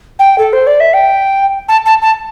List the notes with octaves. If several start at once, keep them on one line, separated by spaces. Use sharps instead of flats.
G5
A4
C5
D5
E5
G5
A5
A5
A5